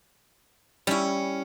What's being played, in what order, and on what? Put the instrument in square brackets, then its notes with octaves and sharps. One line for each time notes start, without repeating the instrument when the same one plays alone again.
[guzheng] G3 E4 [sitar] C#4